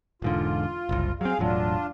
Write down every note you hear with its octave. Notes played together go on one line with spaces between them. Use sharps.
E1 G#2 D3 F4
F#1 C2
F#3 C4 G#4 F5
E1 A2 F#3 D4 F4